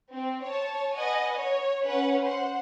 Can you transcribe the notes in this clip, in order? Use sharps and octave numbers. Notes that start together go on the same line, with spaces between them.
C4
C#5 A5
B4 D#5 F#5 G#5
C#5
C#4 B4 F#5
C5 F#5